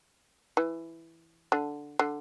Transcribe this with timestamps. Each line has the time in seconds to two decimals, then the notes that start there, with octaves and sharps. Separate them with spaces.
0.57 E3
1.52 D3
1.99 D3